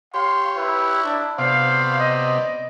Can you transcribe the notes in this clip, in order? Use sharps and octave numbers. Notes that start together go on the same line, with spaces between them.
G4 C#5 F5 C6
E4 B4
D4
C3 B3 C5 D5 F5
D#5